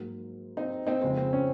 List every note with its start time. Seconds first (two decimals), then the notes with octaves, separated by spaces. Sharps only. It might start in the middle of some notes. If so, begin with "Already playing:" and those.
Already playing: G#2 F#3 A#3
0.57 C4 D#4
0.87 C4 D#4
1.02 F2 C#3 G#3 C4
1.17 C4
1.33 C#4